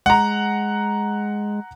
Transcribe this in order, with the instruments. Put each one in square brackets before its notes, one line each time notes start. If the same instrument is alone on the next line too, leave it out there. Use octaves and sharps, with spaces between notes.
[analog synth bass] G#3 [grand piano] F#5 A#5